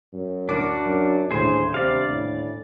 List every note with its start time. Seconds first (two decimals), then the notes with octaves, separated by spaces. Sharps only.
0.13 F#2
0.49 D2 D4 F#4 A#4 D6
0.86 F#2
1.31 D#1 D2 A2 G#4 C5 G#5
1.74 C3 D5 F5
2.10 A2